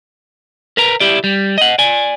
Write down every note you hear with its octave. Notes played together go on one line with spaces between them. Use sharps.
A#4 B4 A#5
E4 G4 D5
G3
D#5 F#5
D5 G#5